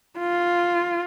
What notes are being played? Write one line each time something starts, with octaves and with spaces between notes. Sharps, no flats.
F4